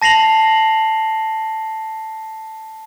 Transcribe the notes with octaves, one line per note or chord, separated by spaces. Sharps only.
A5 A#6 C7 F7 F#7